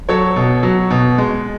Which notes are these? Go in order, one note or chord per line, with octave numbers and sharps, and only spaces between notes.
F#3 A4 C#5
B2
F#3
B2
G#3